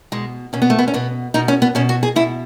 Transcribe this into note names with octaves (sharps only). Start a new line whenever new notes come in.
B2 G#3
B2 C#4
B3
A3
B3
C#4
B2 B3
B2 D#4
C#4
B3
B2 C#4
F#4
G#4
B2 E4